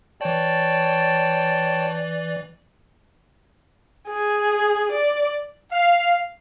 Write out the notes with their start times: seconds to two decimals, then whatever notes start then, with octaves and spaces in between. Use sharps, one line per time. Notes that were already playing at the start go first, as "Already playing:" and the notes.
0.21 E3 C#5 D5 G5 A5
4.08 G#4
4.92 D5
5.72 F5